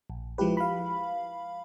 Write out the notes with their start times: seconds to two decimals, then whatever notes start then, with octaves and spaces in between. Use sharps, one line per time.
0.10 A#1
0.38 F3 G#3 E4 G4 B4
0.57 F5 B5